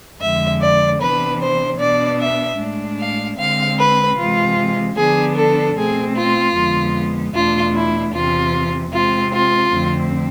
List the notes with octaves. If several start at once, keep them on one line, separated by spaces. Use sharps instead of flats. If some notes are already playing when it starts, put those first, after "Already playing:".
F2 D3 G#3 E5
D5
C3 E3 B3 D4 B4
C5
B2 B3 D4 D5
E5
A2 G#3 D4
F5
D3 G#3 C4 F5
B4
C3 E3 G#3 F4
D3 F3 B3 D4 G#4
A4
B2 A3 C4 G#4
F4
F2 D3 G#3 B3
E2 B2 A3 D4 F4
E4
E2 C3 E3 F4
C3 G#3 C4 F4
F4
F2 D3 A3 C4